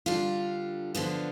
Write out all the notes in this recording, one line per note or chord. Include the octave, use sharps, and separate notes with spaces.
D3 G3 D4 F4
D3 F3 B3 D4 F4